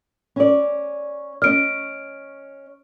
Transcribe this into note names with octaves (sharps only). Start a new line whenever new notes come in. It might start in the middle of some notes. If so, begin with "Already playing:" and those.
C#4 D5
C#4 D#5 F6 D7